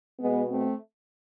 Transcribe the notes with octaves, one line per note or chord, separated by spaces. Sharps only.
B2 G#3 B3
A3 C4